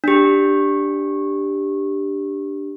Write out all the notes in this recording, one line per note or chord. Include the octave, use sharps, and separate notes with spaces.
D4 G4